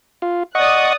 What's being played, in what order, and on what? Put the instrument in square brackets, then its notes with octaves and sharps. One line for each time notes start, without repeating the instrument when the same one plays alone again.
[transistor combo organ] F4
[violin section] D5 D#6 F#6 [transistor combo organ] D#5 F#5 C#6